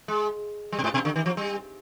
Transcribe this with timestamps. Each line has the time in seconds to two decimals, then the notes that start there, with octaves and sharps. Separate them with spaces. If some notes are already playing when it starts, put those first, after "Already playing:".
0.08 G#3
0.72 G3
0.79 B2
0.84 G#2
0.94 B2
1.05 D3
1.16 D#3
1.26 F3
1.37 G3